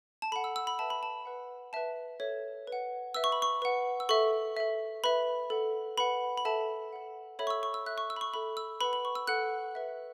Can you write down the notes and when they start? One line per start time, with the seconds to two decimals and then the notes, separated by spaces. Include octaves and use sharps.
0.22 A5
0.32 A4 B5
0.36 F#5
0.44 E6
0.56 E6
0.67 B5
0.79 B4 E5 A5
0.90 B5
1.03 A5
1.25 B4 F#5
1.73 B4 E5 A5
2.20 A4 C#5 E5
2.67 B4
2.72 F#5
3.14 B4 E5 E6
3.24 C#6
3.32 B5
3.42 C#6
3.62 B4 F#5
4.00 E6
4.09 A4 E5 C#6
4.57 A4 E5
5.04 B4 E5 B5
5.50 A4 F#5
5.98 B4 F#5 B5
6.38 B5
6.45 A4 E5 A5
6.93 A4 F#5
7.39 A4 C#5 E5 B5
7.47 C#6
7.50 E6
7.63 C#6
7.74 E6
7.86 A4 E5 F#6
7.98 C#6
8.10 E6
8.16 B5
8.21 C#6
8.34 A4 E5 B5
8.57 E6
8.81 B4 F#5 B5
8.93 B5
9.05 C#6
9.15 E6
9.27 A4 F#5 F#6
9.75 B4 E5